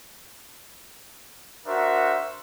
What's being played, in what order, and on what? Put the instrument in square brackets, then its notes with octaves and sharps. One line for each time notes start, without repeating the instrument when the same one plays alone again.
[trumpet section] D4 F#4 A#4 C5 E5